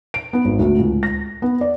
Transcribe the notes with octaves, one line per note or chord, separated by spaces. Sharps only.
D7
B3
G#1
D2
C#2
A#6
B3
D5